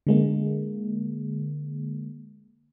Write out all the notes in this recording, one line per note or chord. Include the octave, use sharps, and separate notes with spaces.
D3 G#3 A#3